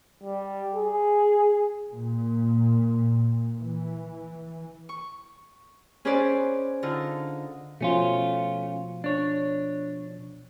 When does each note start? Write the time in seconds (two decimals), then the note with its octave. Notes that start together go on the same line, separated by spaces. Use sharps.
0.23 G3
0.75 G#4
1.90 A#2
3.58 E3
4.89 C#6
6.05 C#4 G#4 B4 C5 D5
6.83 D3 D#4 F4
7.81 B2 F3 A3 C#4 F4
9.04 D4 C#5